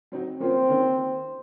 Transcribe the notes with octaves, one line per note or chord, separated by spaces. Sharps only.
F#3 C4 D#4 F#4
F3 A#3 C4 C#4 F4
D#3 A#3 C#4